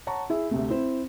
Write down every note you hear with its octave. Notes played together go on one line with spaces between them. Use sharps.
C#5 F#5 A5 A#5 C#6
E4 G#4 E5
D2 C3 A3
C4 E4 C5